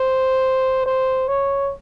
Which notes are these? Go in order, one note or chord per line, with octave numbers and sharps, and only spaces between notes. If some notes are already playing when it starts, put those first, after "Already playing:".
Already playing: C5
C5
C#5